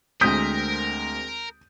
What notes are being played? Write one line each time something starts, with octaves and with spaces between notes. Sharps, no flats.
D2 G#3 C4 A#4 D#6 G6 B6